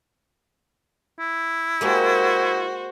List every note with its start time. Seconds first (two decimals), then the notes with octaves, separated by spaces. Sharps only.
1.19 E4
1.81 G#3 A#3 F#4 G4 C5